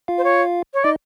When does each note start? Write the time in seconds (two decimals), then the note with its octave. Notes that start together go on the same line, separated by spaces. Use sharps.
0.08 F4 F5
0.18 C5
0.24 C#5
0.74 C#5
0.84 D#4 D5 D#5